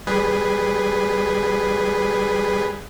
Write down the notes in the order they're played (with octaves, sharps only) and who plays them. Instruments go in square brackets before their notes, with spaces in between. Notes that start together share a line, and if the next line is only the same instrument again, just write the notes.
[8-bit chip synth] G3 G#4 B4